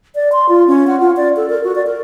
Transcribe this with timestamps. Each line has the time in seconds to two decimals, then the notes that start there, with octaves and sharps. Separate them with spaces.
0.15 D5
0.32 C6
0.49 F4
0.68 C#4
0.87 F#5
1.00 F4
1.17 D5
1.36 A4
1.50 A#4
1.64 F#4
1.75 D5
1.87 A#4